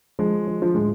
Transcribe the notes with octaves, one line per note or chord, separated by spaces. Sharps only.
F3 G#3
F3
F3
A2 G#3